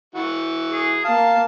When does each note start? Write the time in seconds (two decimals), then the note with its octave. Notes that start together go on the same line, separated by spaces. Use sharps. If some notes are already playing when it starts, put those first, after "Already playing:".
0.15 E3 F#4
0.71 G#4
1.05 A#3 F5 A5